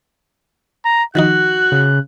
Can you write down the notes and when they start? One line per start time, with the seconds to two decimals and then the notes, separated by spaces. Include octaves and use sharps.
0.85 A#5
1.15 D#3 F3 D#4 F#4 F#6
1.72 C#3